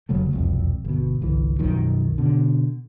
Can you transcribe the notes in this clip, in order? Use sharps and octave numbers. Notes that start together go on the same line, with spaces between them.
F1 C#3 F#3 A3
E1 C2 F2
G1 B2
G1 C2 E3
B1 F#2 D#3 F3
B2 D3